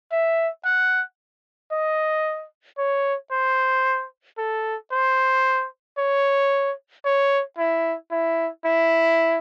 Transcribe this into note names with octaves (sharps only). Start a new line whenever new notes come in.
E5
F#5
D#5
C#5
C5
A4
C5
C#5
C#5
E4
E4
E4